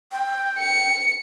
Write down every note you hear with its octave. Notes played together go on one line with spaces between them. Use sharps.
G5
C#7